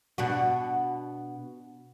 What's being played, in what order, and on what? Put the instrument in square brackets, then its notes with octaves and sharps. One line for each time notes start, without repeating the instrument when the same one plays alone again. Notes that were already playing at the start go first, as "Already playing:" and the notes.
[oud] B2 D4 F#4